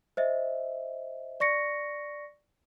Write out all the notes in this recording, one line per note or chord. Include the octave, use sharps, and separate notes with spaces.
C5 D#5 E5
D5 C#6 A#6 C#7